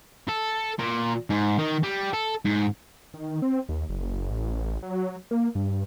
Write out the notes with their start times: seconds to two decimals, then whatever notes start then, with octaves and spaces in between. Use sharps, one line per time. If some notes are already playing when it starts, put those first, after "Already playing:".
0.28 A4
0.79 A#2
1.30 G#2
1.59 D#3
1.83 G3
2.13 A4
2.45 G#2
3.14 D#3
3.42 C4
3.69 D#2
3.89 F#1
4.31 A1
4.83 F#3
5.31 A#3
5.55 G2